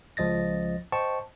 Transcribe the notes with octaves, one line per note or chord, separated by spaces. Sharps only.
C#2 F3 D#5 A6 A#6
C5 D#5 G5 A5 C#6